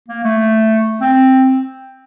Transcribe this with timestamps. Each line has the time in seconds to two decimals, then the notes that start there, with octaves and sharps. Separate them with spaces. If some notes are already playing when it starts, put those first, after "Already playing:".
0.09 A#3
0.24 A3
1.01 C4